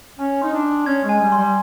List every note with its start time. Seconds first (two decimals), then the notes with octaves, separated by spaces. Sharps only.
0.19 C#4 G#5
0.42 D#4 C6
0.53 D4
0.64 D#6
0.86 C#4 G#6
1.04 G#3 G#5
1.20 G3
1.32 C6
1.38 G3